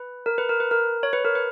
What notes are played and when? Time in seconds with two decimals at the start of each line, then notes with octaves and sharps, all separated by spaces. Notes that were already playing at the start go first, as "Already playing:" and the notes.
Already playing: B4
0.26 A#4
0.38 B4
0.49 A#4
0.60 B4
0.71 A#4
1.03 C#5
1.13 B4
1.25 A#4
1.35 B4